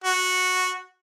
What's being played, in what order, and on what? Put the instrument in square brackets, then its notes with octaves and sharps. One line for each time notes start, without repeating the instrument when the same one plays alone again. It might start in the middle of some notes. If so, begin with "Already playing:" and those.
[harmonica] F#4